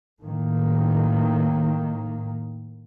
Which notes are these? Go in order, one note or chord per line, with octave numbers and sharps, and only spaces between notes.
A2 D#3 A#3